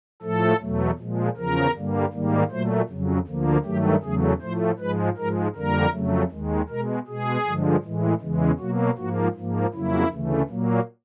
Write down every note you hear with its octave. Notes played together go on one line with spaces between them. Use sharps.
A2 F3 A3 A4
E2 B2 F#3 A3
A#2 F3 G#3
E2 C#3 F3 A#4
G2 D3 G3 A#3
G#2 D#3 G3 A#3
A#2 F#3 A3 C5
F2 C#3 F#3
D2 D3 F3 A#3
G2 D#3 F#3 A3 G4
E2 C#3 F#3 A3 G#4
A2 F3 A3 C5
G#2 F3 G#3 B4
G#2 F3 G#3 A#4
F2 D3 G3 A#3 A#4
F2 C#3 F#3 A3
D#2 D#3 G#3
B2 G#3 A#4
B2 G#3 G#4
G2 D3 F3 G#3
A2 E3 G#3
E2 C#3 E3 G#3
B2 F#3 A#3 F#4
G#2 F3 A#3 F#4
G#2 F3 A#3
F2 C#3 F#3 A#3 E4
D2 C#3 E3 A3
A#2 F#3 A#3